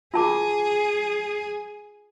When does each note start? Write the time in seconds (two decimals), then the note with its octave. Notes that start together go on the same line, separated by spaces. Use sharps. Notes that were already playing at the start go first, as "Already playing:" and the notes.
0.14 F4 G#4 A5 D6